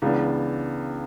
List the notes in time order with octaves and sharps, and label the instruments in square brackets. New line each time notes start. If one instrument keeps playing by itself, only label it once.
[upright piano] C#2 C#3 E3 B3 D4